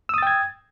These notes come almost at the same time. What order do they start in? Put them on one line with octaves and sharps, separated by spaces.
E6 D#6 A6 G5 G#6